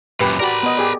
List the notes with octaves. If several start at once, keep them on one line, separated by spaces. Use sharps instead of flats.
F#2 A#2 G4 B4
F#4 G4 A#4 D5 B5
B3 D#5
G4 G#4 D5